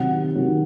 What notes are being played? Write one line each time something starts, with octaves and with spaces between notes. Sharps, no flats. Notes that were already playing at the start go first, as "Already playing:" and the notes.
Already playing: C3 D#3 F#3 F#5
C3 D#3 F#3